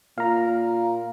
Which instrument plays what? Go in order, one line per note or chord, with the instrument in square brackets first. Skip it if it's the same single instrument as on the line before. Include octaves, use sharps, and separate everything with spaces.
[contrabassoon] A#2 [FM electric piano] F5 A#5